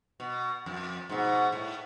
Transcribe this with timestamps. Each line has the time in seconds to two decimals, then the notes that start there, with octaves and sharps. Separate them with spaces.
0.20 B2
0.66 F2
1.09 G#2 B2
1.52 A2